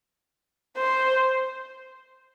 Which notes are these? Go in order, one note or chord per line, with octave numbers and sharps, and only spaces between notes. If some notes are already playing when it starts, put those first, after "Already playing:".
C5